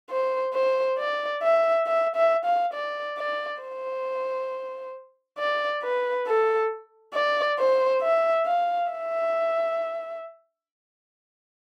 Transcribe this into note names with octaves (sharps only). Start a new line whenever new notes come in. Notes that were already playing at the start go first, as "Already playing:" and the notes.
C5
C5
D5
E5
E5
E5
F5
D5
D5
C5
D5
B4
A4
D5
C5
E5
F5
E5